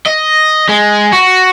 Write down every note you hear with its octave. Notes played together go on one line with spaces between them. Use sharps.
D#5
G#3
F#4